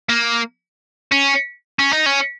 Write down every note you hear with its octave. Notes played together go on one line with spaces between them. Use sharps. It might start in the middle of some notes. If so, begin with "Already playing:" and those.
A#3
C#4
C#4
D#4
C#4